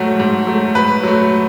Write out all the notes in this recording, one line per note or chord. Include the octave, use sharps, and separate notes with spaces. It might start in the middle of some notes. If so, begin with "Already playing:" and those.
Already playing: G#2 F#3 A3 F#4
G#2
F#3 A3
G#2 B4
F#3 A3